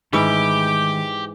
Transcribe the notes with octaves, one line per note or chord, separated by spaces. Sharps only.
G#2 D#3 E3 G#3 A3 E4 G4 D6